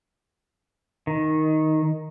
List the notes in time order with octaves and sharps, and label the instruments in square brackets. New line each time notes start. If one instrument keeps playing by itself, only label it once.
[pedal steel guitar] D#3